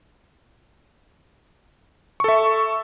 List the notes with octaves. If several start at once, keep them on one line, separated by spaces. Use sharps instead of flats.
A4 E5 C#6